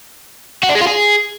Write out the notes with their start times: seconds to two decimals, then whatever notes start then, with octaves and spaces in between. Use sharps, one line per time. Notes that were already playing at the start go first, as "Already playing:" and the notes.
0.63 F#4
0.69 D4
0.75 G#3
0.81 F4
0.87 G#4